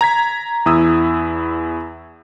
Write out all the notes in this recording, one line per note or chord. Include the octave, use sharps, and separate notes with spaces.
A#5 G#6 B6
E2 E4 D#6 E6